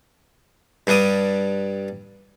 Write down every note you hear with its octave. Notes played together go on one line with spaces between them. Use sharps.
G2 G3 D4 D5 D#6